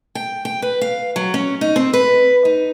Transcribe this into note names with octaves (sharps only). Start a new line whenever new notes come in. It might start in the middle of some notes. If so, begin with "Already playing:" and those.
G5
G5
B4
F5
F#3
C#4
D#4
C4
B4
D#4